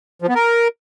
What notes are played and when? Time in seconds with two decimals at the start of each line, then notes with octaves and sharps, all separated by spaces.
0.22 F3
0.29 B3
0.35 A#4